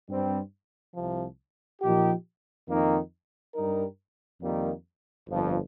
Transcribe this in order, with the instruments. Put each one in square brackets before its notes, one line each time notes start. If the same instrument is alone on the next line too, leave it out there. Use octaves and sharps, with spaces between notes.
[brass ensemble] G2 G3 C4
C2 C3 F3
A#2 F3 D#4 G4
F2 D#3 A#3 D#4
G2 G3 D#4 A#4
F2 D#3 G3 A#3
G1 F2 F3